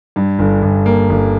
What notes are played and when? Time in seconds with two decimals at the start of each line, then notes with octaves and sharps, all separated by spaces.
0.16 G2
0.39 G1
0.62 G1
0.86 A#3
1.10 G1